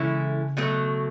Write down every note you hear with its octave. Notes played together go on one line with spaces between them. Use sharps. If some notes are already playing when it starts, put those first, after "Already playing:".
Already playing: C#3 E3 G#3 C#4 E4 A4
B2 F#3 A3